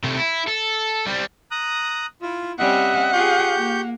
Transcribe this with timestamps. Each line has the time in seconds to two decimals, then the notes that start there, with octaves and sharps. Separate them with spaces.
0.04 C3 A3
0.18 E4
0.47 A4
1.06 G3 C4
1.51 A#5 D#6 F#6
2.22 E4 F4
2.59 G3 C4 C#4 D#5 E5 F#5
3.13 F4 G4 G#4 C#6 G6
3.56 A#3